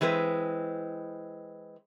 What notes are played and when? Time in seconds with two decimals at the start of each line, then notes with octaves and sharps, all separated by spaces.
0.01 E3 G#3 C4 B4